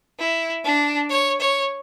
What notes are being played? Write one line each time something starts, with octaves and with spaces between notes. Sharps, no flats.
E4
D4
C#5
C#5